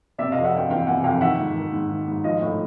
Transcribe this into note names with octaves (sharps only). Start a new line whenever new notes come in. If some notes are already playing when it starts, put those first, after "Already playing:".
C3 D5 E5
F2 D#5 F5
E5 F#5
F2 F5 G5
E3 F5 G5
C3 F#5 G#5
F2 F5 G5
D#3 E5 F#5
G#2
D#3
G#2
D#3
G#2
F3 D#5 F5
A2